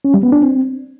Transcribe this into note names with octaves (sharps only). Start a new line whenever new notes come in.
C#4
G3
B3
D4
C4